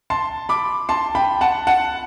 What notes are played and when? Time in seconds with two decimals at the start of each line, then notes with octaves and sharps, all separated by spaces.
0.10 A5 C6
0.49 B5 D6
0.89 A5 C6
1.15 G5 B5
1.41 F#5 A5
1.67 F#5 A5